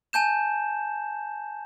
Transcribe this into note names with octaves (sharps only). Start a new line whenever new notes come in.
G#5 A5 G6 E7